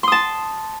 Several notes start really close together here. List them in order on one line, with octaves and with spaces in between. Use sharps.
C6 D#6 A5